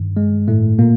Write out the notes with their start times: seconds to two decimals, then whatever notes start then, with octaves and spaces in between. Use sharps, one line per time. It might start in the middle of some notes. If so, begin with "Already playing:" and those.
Already playing: G2 D#3
0.17 G#3
0.48 A2 A3
0.79 A#2 A#3